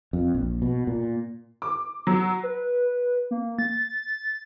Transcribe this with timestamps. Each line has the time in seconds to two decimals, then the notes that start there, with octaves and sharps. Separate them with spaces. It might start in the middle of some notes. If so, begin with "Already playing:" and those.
0.13 F2
0.35 A#1
0.62 B2
0.87 A#2
1.62 D6
2.07 F#3
2.43 B4
3.31 A#3
3.59 A6